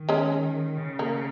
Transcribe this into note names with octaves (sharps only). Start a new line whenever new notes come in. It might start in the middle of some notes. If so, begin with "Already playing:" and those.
Already playing: D#3
G#3 C#4
C#3
A#3